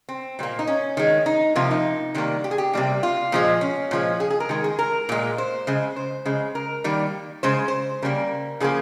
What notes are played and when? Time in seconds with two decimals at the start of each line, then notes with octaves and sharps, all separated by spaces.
0.09 C4
0.39 A#2 G3
0.43 A#3
0.59 D#4
0.67 C#4
0.97 D#3 G#3
1.26 D#4
1.56 C3 F3 A#3 F4
1.71 D#4
2.14 C3 D#3 G3 A#3
2.44 G4
2.51 G#4
2.58 G4
2.73 C3 G3 A#3
3.03 F4
3.32 A#2 F3 G#3
3.61 C#4
3.91 A#2 F3 G#3
4.20 G#4
4.30 G#4
4.40 A#4
4.49 D#3 G#3 G#4
4.64 G#4
4.79 A#4
5.09 A#2 G#3
5.38 C5
5.67 C#3 G#3
5.96 C5
6.25 C#3 G#3
6.55 A#4
6.84 D#3 G3 A#3
7.43 C#3 G#3 C5
7.68 C5
8.02 C#3 G3 A#3 A#4
8.60 C#3 F3 A#3 G#4